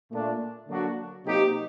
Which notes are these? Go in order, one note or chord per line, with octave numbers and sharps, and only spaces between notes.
A#2 A3 D4
D3 F#3 A#3 D4 F#4
C3 F#3 A#3 D#4 G4